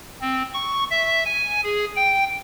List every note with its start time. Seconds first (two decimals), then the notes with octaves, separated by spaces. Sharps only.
0.21 C4
0.54 C#6
0.90 E5
1.25 G#5
1.64 G#4
1.96 G5